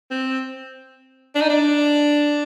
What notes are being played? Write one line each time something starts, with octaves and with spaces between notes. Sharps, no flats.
C4
D4
D#4
D4